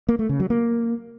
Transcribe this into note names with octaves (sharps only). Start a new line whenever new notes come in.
A#3
A3
C#3
F#3
A#3